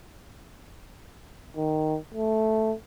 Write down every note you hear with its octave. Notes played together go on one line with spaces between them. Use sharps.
D#3
A3